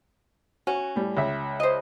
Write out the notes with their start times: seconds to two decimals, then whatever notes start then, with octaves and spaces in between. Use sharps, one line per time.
0.67 C#4 F#4
0.96 A2 G3
1.17 C#2 E5
1.60 C5 D#5